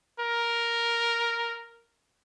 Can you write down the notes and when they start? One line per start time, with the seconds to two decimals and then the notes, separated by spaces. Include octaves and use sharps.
0.20 A#4